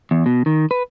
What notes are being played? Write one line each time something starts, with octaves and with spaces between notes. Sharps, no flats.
E2
B2
D#3
B4